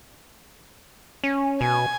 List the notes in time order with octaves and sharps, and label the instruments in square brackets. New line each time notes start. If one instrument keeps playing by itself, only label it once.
[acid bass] C#4
[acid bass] B2 [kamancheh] G#5